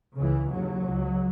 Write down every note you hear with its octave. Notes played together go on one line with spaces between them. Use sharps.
C#2 C#3 E3
D#2 C#3 F#3
C#2 C#3